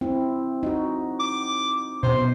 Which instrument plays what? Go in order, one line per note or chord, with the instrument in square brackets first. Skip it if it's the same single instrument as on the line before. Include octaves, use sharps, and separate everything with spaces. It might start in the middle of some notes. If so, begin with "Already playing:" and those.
[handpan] C4 E4
D#4 F#4
[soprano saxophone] D6
[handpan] B2 [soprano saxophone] C5